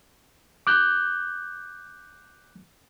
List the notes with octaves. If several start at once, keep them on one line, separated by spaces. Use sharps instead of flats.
D6 F#6 G6